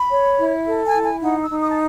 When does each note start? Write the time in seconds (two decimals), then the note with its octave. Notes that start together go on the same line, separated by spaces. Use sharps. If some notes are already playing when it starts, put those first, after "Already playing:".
Already playing: B5
0.10 C#5
0.38 E4
0.66 A4
0.84 G#5
0.94 E4
1.03 G#5
1.22 D#4 F#5
1.41 E6
1.50 D#4
1.60 D#6
1.69 A5